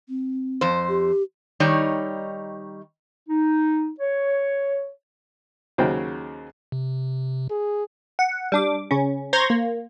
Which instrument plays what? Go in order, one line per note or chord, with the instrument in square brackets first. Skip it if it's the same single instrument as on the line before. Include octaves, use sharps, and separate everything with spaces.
[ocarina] C4
[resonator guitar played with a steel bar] F2 C5
[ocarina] G4
[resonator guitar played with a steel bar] D#3 G3 D#4 C#5 D5
[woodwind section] D#4
C#5
[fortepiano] D#2 C#3 F#3 C5 G5
[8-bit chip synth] C3
[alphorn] G#4
[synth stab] F#5
G3 D4 D6
C#3 C#4
C5 A#5 C6 C#6 G#6 A#6
A#3